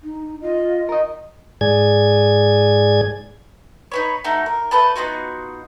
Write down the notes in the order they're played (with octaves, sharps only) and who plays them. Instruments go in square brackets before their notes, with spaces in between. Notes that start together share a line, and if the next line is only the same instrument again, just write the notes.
[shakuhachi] D#4
[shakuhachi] F4 [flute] D#5
[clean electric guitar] A#4 D#5
[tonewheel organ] G#2 G#4 D5 G#6
[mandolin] D#4 B4 C#5
A3 D#4 F#4
A#4
A3 A4 B4 A5
B3 D#4 F4 F#4